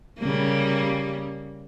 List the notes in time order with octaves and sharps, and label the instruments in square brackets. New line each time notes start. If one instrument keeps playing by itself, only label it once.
[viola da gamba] C#3 G3 A#3